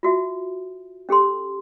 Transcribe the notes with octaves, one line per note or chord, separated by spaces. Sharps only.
F4 F#4 E5
C#4 G4 A4 C6